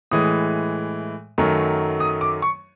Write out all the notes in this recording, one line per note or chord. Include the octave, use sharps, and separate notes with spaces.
A2 E3 G#3 D#6
F#2 D#3 F#3 A3
D#6
D6
C#6